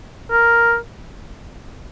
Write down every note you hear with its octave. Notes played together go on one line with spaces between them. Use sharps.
A#4